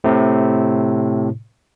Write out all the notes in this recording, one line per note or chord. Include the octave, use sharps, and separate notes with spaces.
A2 C3